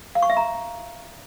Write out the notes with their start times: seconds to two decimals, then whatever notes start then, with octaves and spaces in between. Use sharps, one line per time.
0.15 F5
0.22 C#6
0.30 E5
0.37 A#5